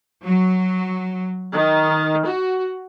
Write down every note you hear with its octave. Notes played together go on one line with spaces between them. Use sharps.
F#3
D#3
F#4